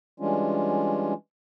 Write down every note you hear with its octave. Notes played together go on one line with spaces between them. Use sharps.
E3 G3 G#3 C#4 D4 F4